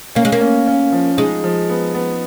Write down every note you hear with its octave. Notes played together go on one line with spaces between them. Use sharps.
A#3 C#4
G#3
A#3
C#4
C#4
F3
G#3 D#4
F3
B3
B3